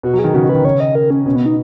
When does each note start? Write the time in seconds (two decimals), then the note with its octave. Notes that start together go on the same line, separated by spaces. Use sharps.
0.03 B2 F#4
0.13 F#3
0.19 G#4
0.24 D#3
0.34 C#3 F#4
0.44 D#3
0.49 B4
0.55 D#3
0.64 C#3 C#5
0.80 D#5
0.95 A#4
1.10 C#4
1.26 B2 C#4
1.36 B3
1.46 D#4